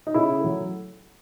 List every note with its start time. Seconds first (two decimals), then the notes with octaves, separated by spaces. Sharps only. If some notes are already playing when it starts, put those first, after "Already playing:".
0.07 D#4
0.14 C#3 E4
0.40 F#3 A3